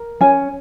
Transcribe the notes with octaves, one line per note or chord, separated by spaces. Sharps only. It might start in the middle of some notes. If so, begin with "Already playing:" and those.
Already playing: A#4
C#4 G#5